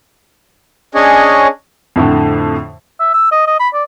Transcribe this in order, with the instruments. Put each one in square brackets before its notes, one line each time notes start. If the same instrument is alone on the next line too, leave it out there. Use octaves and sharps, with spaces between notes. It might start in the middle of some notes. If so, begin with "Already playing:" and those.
[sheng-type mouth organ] C#4 D4 G#4 C#5 D#5
[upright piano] F2 A2 D3
[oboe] E5
E6
D#5
D#5
B5
D5